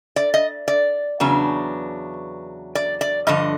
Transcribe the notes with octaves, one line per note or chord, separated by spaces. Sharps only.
D5
D#5
D5
E2 C#3 F#3 B3 D4
D5
D5
G2 D3 F3 D#5